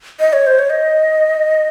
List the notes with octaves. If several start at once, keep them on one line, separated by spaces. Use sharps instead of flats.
D#5
C#5
C5
C#5
D#5